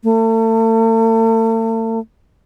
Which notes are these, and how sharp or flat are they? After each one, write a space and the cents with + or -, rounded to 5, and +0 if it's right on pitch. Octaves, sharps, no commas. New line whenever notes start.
A3 +40